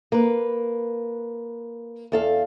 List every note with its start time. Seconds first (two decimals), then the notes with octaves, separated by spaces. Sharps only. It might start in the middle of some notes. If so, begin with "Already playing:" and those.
0.12 A#3 B4
2.12 E2 A4 F5